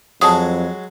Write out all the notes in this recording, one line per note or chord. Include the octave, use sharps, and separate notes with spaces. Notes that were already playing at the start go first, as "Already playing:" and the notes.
F2 F#3 G#3 A5 D#6